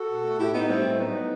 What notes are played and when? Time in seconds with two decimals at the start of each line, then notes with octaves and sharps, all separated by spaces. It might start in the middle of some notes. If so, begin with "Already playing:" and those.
Already playing: F#4 A4
0.08 B2
0.23 A3
0.38 A2 E4 G4
0.53 A2 B3 D#4
0.68 G3 A3 C4
0.84 A2
0.98 F#3 B3 D#4
1.13 F#3